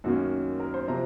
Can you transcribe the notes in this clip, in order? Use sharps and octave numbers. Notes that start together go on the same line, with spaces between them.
F#2 D#3 A#3 C#4 F#4
A#4
C5
C3 F3 C4 A#5